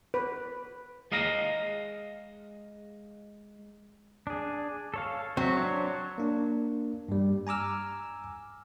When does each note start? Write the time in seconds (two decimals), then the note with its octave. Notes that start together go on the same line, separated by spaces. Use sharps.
0.14 B4
1.12 G#3 D#5 F5 A#5
4.27 D4 G#4
4.94 A4 C#5 F5
5.37 F#3 C4 E5
5.57 D4 C5 C#5
6.18 A#3 D4
7.08 G2 G3
7.47 G#5 A#5 D6 E6 F6